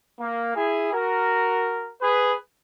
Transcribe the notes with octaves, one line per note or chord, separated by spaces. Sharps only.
A#3
E4 G#4
F#4 A#4
G#4 B4